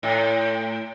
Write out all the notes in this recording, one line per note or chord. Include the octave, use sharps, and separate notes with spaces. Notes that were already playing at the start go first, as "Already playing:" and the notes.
A2